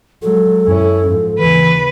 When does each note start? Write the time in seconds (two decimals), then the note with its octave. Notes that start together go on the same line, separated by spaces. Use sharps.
0.22 F#3 G#3 A4
0.68 F#2 C#4 E4
1.08 G#2 F3
1.39 D#2 C#3 E3 B4